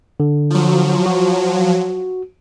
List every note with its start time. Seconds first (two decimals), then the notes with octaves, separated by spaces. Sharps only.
0.20 D3
0.50 F3 F#3
1.06 F#4